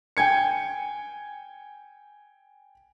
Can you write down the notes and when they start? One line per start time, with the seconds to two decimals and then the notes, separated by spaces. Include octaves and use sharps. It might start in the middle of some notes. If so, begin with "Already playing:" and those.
0.17 G5 G#5 G#6 C#7